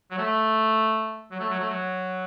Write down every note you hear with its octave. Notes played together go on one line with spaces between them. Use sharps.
F#3
A3
F#3
A3
F#3
A3
F#3